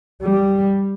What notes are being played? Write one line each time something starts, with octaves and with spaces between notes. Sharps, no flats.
G3